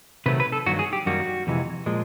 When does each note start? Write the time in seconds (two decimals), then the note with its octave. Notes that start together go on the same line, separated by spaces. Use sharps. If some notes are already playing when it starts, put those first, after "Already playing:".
0.26 C3 D#3 F#3 A3 B4
0.40 B4
0.52 A4
0.66 G2 D#3 F#3 A#3 F#4
0.79 G#4
0.93 G4
1.06 F#2 D#3 G3 A#3 F#4
1.47 F2 C3 E3 G#3
1.86 A#2 F3 G#3